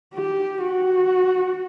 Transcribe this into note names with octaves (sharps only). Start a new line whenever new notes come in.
G4
F#4